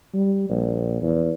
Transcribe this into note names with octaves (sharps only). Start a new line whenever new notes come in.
G3
A#1
E2